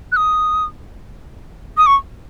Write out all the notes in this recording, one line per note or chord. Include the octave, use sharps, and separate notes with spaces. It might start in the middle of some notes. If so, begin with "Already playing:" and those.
F#6
D#6
D#6
C#6